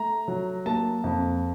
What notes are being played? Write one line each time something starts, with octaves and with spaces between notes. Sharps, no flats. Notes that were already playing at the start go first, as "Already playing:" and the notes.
Already playing: A3 A#5
F#3
A#3 A5
F2